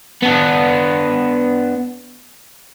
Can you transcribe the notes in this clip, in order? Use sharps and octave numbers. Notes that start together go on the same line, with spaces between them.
B3 D4